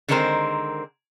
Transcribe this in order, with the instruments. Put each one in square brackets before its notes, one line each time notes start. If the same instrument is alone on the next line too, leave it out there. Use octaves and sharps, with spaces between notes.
[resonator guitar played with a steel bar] D3 D#3 G#3 C4 A#4 C5